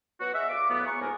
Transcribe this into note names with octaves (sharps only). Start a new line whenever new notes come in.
F#3 B3 F#4
G#4 D#5 E5
D2 F5 D6
A2 F#3 B3
G#4 A#5 C#6
C#2 G#2 A#3 A#4 G#5